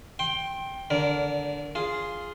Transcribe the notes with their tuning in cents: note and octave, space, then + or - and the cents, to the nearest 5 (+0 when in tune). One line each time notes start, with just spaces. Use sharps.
G5 +0 C6 +30
D3 -10 A#4 +0 D5 -30
F4 +0 G#4 +0